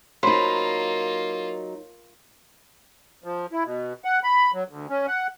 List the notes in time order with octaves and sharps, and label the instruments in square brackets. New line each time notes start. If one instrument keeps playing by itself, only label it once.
[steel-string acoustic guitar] F#3 D#4 [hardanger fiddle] A#3 F4 [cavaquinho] C5 B5
[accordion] F3
E4
B2
F#5
B5
F#3
D2
C#4
F#5